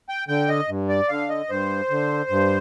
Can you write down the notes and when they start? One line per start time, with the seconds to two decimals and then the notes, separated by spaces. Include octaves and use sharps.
0.09 G5
0.28 D3 G5
0.49 D#5
0.68 G2
0.89 D5
1.09 D3 F5
1.29 D#5
1.49 G2 C5
1.90 D3
2.30 G2